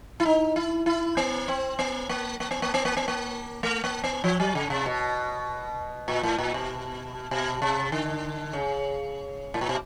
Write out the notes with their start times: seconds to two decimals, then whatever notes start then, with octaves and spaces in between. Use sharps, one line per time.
0.20 E4
0.25 D#4
0.56 E4
0.86 E4
1.17 B3
1.48 C4
1.79 B3
2.09 A#3
2.40 A#3
2.51 B3
2.62 A#3
2.74 B3
2.85 A#3
2.97 B3
3.08 A#3
3.63 A3
3.84 A#3
4.03 B3
4.24 F3
4.40 F#3
4.55 C#3
4.70 C3
4.86 B2
6.08 A#2
6.23 A2
6.38 A#2
6.54 B2
7.31 B2
7.62 C3
7.92 D3
8.53 C#3
9.54 A2
9.61 A#2
9.69 B2